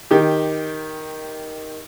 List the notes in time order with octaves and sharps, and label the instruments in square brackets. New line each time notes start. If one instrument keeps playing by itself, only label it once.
[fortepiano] D#3 G4